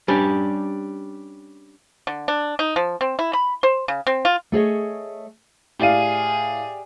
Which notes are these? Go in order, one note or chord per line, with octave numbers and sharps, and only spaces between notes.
G3 C#4 D4 G4
D3
D4
D#4
F3
C4
E4
B5
C5
C#3
C4
F4
A3 G#4 C#5 D#5
A2 G4 G#4 D5 F5 D#7